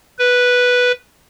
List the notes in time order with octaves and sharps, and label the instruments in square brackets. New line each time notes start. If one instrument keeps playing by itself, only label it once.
[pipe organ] B4